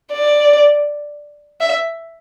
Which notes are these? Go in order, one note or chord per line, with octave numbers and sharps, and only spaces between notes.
D5
E5